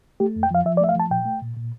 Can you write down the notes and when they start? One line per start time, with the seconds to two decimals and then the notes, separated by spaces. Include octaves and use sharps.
0.20 A3 G4
0.36 F2
0.43 G5
0.51 F3 F5
0.66 F3 E5
0.77 D5
0.81 A3 E5
0.89 F5
0.96 F3 A5
1.11 A#2 G5
1.26 A3
1.41 A#2
1.57 A#2